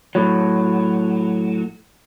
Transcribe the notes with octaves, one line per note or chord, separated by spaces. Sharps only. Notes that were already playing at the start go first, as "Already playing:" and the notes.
A2 F#3